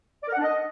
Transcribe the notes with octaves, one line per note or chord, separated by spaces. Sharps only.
D5
A#4
F#5
D4
D#5